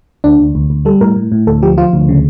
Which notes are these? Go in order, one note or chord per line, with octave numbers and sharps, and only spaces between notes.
D2 D4
D2
D2
D2
G3 A4
A2 A#4
A2
A2
D2 A4
F3 G4
F3 F4
D2
C#3